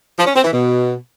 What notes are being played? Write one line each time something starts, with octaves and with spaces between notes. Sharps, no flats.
F3
C#4
C4
E3
B2